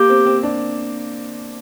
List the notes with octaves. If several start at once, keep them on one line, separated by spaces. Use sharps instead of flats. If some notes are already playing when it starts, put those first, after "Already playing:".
Already playing: A#3 G4
C4
C4
D4